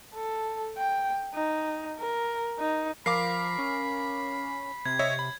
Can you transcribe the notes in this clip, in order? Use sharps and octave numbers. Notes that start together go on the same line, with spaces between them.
A4
G5
D#4
A#4
D#4
F3 A#4 F5 B5 D6 C7
C#4
C3 G#6
C#5 D#5 E5
B5